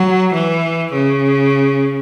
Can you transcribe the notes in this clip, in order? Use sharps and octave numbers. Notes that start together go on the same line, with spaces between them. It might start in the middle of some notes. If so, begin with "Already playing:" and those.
Already playing: F#3
E3
C#3